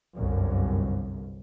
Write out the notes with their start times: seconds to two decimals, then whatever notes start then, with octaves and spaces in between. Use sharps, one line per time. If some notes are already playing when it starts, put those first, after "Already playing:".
0.16 G1 C2 F#2